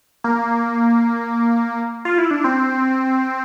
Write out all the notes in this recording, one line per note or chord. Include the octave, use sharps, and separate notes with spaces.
A#3
F4
E4
D4
C4